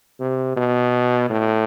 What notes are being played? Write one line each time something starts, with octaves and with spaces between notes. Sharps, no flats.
C3
B2
A2